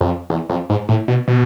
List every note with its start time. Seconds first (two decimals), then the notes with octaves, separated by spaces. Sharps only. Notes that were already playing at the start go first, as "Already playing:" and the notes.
0.01 F2
0.30 E2
0.50 F2
0.70 G#2
0.89 A2
1.08 B2
1.28 B2